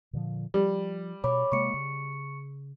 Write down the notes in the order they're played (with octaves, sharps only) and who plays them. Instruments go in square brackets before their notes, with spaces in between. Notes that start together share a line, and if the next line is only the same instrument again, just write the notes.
[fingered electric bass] A#2 D3 F3
[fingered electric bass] F3 [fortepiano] G3
[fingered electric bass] B2 [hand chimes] C#5 B5 D6
[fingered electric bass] C3 G#3 A#3 [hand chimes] C#6 C#7
[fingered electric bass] C#3